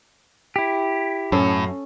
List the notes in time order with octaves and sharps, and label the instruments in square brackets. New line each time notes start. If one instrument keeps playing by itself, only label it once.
[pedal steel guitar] E4 G4
[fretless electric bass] F#2 [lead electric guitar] A2 [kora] C#4 A4